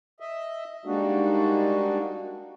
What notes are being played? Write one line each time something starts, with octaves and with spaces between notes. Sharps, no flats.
D#5 E5
G3 G#3 A#3 D4 D#4 F#4